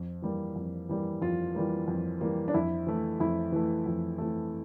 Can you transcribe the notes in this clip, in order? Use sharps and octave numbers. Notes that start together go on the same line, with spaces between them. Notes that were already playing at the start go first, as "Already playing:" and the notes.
Already playing: F2
E3 G3 A#3
F2
E3 G3 A#3
F2 F4
E3 G3 A#3
F2
E3 G3 A#3
D4
F2 E4
E3 A3
F2 E4
E3 A3
F2
E3 A3